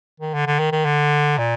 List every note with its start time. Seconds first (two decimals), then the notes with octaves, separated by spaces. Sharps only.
0.20 D#3
0.34 D3
0.47 D3
0.59 D#3
0.72 D#3
0.85 D3
1.38 A#2